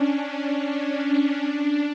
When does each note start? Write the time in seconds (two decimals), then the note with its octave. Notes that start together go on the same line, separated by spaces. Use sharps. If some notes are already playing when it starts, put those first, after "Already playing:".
Already playing: C#4 D4
0.40 C#4
1.34 D4